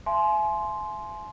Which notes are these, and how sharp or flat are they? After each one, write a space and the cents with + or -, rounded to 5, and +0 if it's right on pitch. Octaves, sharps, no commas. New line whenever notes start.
E5 +35 G#5 +40 C6 +0